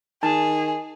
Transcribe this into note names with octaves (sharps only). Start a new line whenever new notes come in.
D#3 G#4 A5